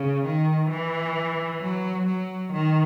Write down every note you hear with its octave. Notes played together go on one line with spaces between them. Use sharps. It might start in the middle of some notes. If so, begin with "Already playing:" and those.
Already playing: C#3
D#3
E3
F#3
F#3
D#3